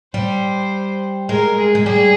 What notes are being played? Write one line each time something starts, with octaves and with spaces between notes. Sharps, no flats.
G3 C5
G#3 A#4
G#4
G#3
G3 G#4